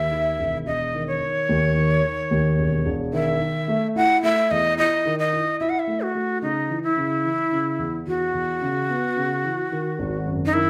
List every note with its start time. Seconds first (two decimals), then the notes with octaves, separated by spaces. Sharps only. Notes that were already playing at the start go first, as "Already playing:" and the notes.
Already playing: D#2 E5
0.11 D#3
0.39 E1
0.66 E1 D#5
0.94 D#3
1.07 C#5
1.21 D#3
1.49 D#2
1.77 D#3
2.03 D#3
2.31 D#2
2.58 E1
2.85 E1
3.13 D#3 E5
3.40 D#3
3.68 A3
3.96 E4 F#5
4.23 A3 E5
4.51 E2 D#5
4.78 E4 D#5
5.05 D#3
5.19 D#5
5.33 E4
5.60 E4 E5
5.69 F#5
5.79 E5
5.87 A3
6.01 F#4
6.15 A3
6.42 C#3 D#4
6.70 E3
6.83 E4
6.97 C#3
7.25 E3
7.52 C#3
7.79 E2
8.06 E2 F#4
8.34 E2
8.62 C#3
8.89 B3
9.16 C#3
9.44 E3
9.72 D#3
9.99 G#1
10.26 F#2
10.45 D#4
10.53 D#3 E4